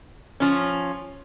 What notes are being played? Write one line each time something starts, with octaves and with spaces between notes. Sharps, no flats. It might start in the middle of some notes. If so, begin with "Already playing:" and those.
F3 C#4